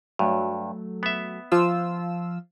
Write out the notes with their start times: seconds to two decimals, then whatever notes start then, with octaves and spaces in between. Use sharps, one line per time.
0.19 G2 F#3 A3
1.03 B3 E5
1.52 F3 F4 E6